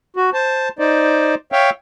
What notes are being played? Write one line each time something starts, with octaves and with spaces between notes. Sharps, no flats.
F#4
C5 A5
D#4 C5 D5
C#5 E5 F5 G5